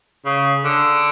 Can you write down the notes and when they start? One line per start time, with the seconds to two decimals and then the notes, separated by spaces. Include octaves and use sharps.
0.25 C#3
0.64 D3